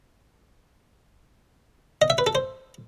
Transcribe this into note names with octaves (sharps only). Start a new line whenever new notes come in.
D#5
E5
B4
A4
C5